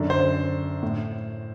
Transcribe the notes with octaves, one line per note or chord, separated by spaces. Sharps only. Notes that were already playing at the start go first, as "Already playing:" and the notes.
Already playing: F#2 D3
C5
A2